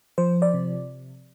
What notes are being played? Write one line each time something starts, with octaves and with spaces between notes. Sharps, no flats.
F3 C5
D5
C3